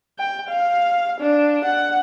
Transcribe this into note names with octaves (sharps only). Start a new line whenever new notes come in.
G5
F5
D4
F#5